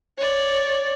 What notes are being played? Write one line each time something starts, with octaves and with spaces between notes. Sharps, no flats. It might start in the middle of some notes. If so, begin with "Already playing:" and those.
C#5 D5